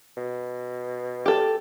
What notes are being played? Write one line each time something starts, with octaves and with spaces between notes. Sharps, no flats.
B2
G4 A4